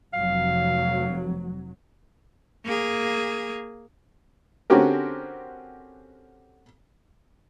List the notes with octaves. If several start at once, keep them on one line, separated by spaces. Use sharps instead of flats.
F1 F#3 F5
A#3 G#4
D3 C4 C#4 F#4 G4 A#4